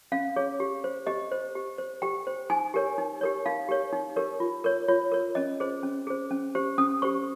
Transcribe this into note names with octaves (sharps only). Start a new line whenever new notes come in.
C#4 F5
G#4 C#5
G4
C5
G4 D#5
C5
G4
C5
G4 G5
C5
D#4 G#5
G4 A#4 C#5
D#4
G4 A#4 C#5
D#4 F5
G4 A#4 C#5
D#4
G4 A#4 C#5
F4
A#4 C#5
F4 C#5
A#4 C#5
C#4 D#5
G#4 C5
C#4
G#4 C5
C#4
G4 C5
C#4 D#6
G4 C5 C#6